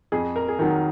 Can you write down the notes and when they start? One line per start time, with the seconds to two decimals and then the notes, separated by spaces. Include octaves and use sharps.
0.12 F2 G#4
0.36 A#4
0.48 G#4
0.59 D#3 A#4
0.61 F#3